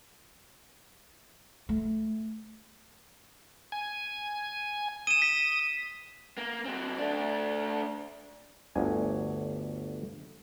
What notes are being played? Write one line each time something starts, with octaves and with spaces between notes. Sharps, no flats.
A3
G#5
D#6 D#7 E7
B6
A#3
F#3 C4
A3 D4
G1 D2 G#5